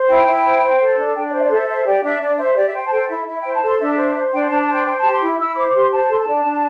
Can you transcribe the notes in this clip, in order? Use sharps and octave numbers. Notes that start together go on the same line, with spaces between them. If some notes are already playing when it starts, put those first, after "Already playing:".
Already playing: C5
E4 G5
E4
C5
C5
A4
D4
D4 G5
D5
C5 E5
D5
A4 E5
C5 E5
G4 D5
D4 E5
D4 D5
C5 E5
G4 D5
E5
C5 G5
A5
A4 G5
E4 E5
E4 E5
C5 G5
A5
A4 C6
D4 E5
C5
C5
D4 G5
D4 A5
A5
C5 G5
C5 G5
A5
G4
C6
E4
E4 E6
C5 D6
D6
G4 C6
C5 A5
A4 C6
A5
D4
D4